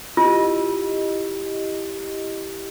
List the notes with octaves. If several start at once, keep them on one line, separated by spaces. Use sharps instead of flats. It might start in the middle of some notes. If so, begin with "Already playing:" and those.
E4 F4 G4 D#5